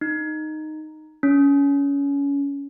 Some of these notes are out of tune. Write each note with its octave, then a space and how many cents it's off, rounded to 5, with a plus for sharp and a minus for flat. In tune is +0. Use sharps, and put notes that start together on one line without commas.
D#4 -5
C#4 +25